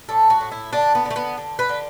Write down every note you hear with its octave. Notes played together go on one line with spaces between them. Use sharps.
A2 A4
F#4
A2
E4
D3 D4
B3
D3
A3
B3
D3
B4
D3